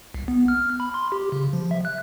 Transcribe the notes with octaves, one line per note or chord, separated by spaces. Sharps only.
C2
B3
F6
B5
C6
G4
C#3
F3
E5
F#6